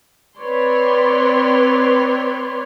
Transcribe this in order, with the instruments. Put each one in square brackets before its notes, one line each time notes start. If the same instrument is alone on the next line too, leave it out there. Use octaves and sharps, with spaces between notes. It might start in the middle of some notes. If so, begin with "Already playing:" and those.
[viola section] C4 B4 C#5 D5 C6